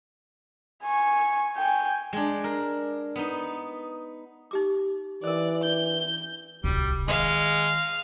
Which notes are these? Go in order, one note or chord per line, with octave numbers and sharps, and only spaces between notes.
G#5 C#6
G5 G#5
G#3 D4
A#4
B3 D#4
D#4 G4 D6
E3 A#4 C5 D5
G6
D1 C2 G3
D#3 G#3 F5